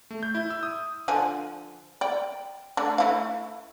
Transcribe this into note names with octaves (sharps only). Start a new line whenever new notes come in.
A3
G6
E4
E6
D#6
D3 F3 G#5
D5 G5
A3 D4
A3 E4 F5